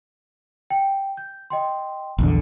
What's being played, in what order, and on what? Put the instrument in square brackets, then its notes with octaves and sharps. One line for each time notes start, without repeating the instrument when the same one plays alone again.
[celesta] G5
G6
D#5 G5 C6
[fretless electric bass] A#1 E2 D3